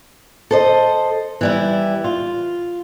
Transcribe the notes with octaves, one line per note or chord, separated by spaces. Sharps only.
A4 C5 D#5
E3 G3 E4
F4